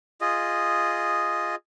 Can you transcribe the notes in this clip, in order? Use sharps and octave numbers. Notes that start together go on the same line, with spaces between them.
F4 G#4 D#5